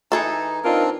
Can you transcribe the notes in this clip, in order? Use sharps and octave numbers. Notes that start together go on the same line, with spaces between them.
E3 D#4 G#4 A4
C4 D4 D#4 F4 A#4